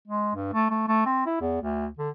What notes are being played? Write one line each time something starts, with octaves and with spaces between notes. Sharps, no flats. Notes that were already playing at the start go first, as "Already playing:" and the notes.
G#3
G2
A3
A3
A3
C4
E4
E2
D2
D3